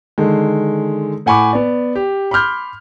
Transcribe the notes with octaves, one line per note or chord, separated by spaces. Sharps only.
D3 D#3 G#3
A2 F#5 G#5 B5 C#6 D6
B3 D5
G4
B5 C6 D6 F6 G6